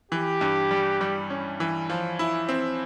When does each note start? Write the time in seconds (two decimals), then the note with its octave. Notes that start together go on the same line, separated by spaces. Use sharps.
0.11 E3 G4
0.41 G2
0.71 G3
1.01 G3
1.30 C#4
1.60 E3
1.90 F3
2.19 E4
2.49 C4